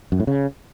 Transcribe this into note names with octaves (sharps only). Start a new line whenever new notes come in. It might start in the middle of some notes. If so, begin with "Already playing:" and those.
F#2
A2
C#3